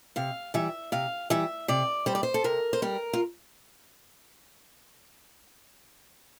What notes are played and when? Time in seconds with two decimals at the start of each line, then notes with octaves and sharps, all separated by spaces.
0.16 C3 F5
0.54 E3 G3 E5
0.92 C3 F5
1.30 E3 G3 E5
1.68 C3 D5
2.06 G3 C5
2.15 D5
2.23 C5
2.34 A4
2.44 C3 A#4
2.73 C5
2.82 G3 A#4
3.13 F4